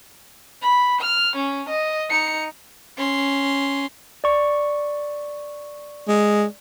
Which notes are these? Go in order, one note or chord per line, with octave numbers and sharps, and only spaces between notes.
B5
F6
C#4
D#5
D#4 C#7
C#4 C6
D5 C#6
G#3